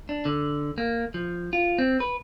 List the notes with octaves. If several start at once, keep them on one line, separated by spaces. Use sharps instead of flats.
D4
D3
A#3
F3
F4
C4
B4